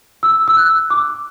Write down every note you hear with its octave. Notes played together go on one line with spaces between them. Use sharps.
E6
E6
F#6
D6